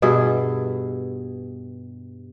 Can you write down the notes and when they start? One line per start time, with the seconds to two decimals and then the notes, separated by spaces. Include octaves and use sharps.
0.02 G2 B2 G#4 E5